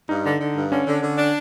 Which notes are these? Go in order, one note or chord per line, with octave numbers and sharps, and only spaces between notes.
G2 D#4
D3
D3
G2
D3 C#4
D3
D3
D4